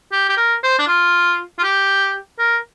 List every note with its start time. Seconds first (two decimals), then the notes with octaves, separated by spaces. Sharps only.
0.12 G4
0.29 G4
0.37 A#4
0.64 C5
0.79 D4
0.88 F4
1.59 F4
1.63 G4
2.39 A#4